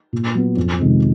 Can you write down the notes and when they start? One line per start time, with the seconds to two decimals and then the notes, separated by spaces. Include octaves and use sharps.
0.13 A#2
0.35 F#3 B3
0.57 F2
0.79 C3 D#3 G#3 C4